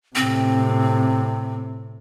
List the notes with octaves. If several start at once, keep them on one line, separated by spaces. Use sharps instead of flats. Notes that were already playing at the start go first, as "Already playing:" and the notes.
A2 C3 C4